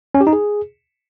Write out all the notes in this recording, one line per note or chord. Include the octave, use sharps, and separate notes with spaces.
C#4
G4
D#4
G#4